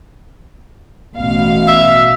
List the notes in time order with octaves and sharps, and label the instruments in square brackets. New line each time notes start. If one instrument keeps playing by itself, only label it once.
[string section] A1 B2 F5
[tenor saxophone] E5